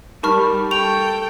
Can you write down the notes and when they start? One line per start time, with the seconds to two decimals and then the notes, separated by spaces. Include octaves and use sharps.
0.23 G3 D#4 A#4 A5 B5 C#6 F6
0.71 A4 G5 C#6 F7